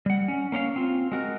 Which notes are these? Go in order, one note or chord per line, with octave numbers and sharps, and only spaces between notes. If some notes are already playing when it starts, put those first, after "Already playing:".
G3 F#5
C#4
A#3 C#4 C#5 F5
C4 F4
G#3 F#4 A#4